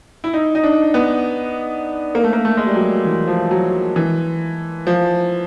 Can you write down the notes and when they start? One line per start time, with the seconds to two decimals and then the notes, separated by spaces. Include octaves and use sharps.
0.24 E4
0.33 D#4
0.55 D#4
0.63 D4
0.94 B3
2.15 A#3
2.24 A3
2.33 A#3
2.45 A3
2.57 G#3
2.66 G3
2.76 F#3
3.05 E3
3.28 F3
3.51 F#3
3.96 E3
4.87 F3